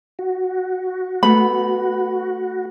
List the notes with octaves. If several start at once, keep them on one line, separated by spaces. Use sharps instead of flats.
F#4
A3 B3 B5